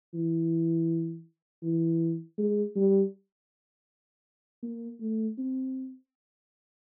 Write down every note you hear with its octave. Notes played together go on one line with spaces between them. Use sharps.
E3
E3
G#3
G3
A#3
A3
C4